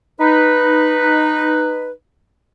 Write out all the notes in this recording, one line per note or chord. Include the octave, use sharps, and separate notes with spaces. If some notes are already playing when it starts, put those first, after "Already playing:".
D#4 B4